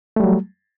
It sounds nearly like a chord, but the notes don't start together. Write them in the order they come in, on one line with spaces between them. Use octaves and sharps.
A3 G3 F#3